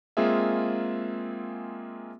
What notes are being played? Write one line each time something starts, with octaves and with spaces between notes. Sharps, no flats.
G#3 A#3 C4 F4 G#4 E5